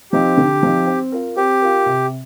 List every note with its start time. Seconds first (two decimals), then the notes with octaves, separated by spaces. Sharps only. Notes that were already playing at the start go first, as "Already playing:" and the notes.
0.12 F3 C4 D#4 G4
0.37 D3
0.63 F3 C4 D#4
0.87 C4
1.12 F4 A#4
1.37 C4 G4
1.61 F4 A#4
1.86 C3